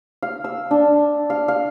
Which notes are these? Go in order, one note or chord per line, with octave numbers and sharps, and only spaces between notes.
F5
E6
D4
F5
F5